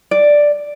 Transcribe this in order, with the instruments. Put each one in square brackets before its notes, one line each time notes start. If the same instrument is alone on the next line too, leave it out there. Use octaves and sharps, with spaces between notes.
[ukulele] D5